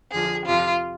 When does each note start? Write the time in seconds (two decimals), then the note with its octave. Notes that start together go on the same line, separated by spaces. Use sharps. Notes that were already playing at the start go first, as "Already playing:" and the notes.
0.11 F2 D3 F3 G#4
0.46 F2 C3 F3 F4